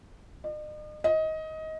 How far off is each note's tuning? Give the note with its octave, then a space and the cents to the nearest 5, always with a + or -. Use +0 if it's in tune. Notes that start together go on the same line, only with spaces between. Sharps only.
D#5 -45
D#5 +20